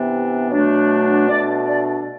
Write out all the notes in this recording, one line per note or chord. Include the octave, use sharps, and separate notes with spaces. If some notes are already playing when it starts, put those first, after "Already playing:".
Already playing: C3 E3 B3 D4
B2 F#3 A3 D4
B2 A3 D4 D5
D5